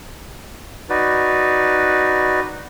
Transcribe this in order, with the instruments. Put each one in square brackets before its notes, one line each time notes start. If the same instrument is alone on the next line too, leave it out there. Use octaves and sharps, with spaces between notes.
[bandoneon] D#4 F#4 B4 D5